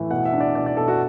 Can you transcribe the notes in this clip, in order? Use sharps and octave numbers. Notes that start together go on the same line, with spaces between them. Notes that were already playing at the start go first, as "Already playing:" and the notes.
Already playing: A2 E3
B2 F#5
E5
D4
D5
B2 D5
D5
B2 A4
F#4